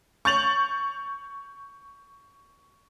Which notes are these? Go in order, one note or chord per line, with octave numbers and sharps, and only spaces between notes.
C#6 G6 A6 F7 F#7